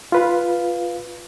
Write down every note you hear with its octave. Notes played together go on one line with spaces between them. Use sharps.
F4 B4 F5